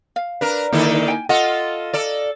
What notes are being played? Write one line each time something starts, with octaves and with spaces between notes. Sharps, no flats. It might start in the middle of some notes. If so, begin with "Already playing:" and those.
F5
D4 A#4 B4
D3 D#3 A#3 D#4 E4 A4
G5 G#5
F4 A4 D#5 F#5
A4 D5